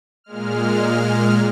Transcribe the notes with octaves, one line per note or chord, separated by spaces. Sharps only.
A#2 G#3 F6